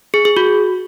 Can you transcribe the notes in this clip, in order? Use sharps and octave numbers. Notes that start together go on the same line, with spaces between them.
G#4
G#4
F#4